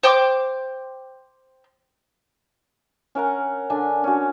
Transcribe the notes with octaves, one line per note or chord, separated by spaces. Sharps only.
C5 G5 C6 D6
C#4 A#4 F#5 A#5
D3 D4 G#5
C#4 F#4